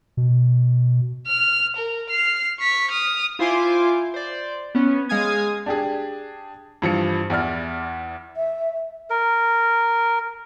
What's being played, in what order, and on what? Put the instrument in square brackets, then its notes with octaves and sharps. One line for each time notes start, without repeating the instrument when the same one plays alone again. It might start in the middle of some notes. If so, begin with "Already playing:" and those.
[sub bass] B2
[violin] F6
A#4
F6 C7
C#6 B6
D#6 F6
[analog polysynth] E4 F4 C5 G#5 C6 D6
C5 D5
B3 C#4
G#3 F5 G#5 D#6 G#6
[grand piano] D4 G4 G#4
G2 E3 F3 C#7
E2 E4 D5 F6
[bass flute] E5
[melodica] A#4